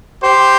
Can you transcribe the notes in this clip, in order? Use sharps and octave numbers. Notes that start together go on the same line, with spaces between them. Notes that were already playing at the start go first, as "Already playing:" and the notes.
G4 C5